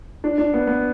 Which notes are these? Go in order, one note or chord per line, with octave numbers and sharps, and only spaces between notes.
D4
D4
B3
B3